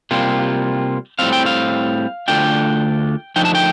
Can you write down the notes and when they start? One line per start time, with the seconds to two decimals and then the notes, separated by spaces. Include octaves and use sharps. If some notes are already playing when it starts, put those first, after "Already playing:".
0.11 C3 G3 A#3 F4
1.19 A2 G3 C4 F5
1.33 G5
1.46 F5
2.28 D2 D3 A3 D4 F4 G5
3.36 D3 F3 A3 D#4 G5
3.45 A5
3.55 G5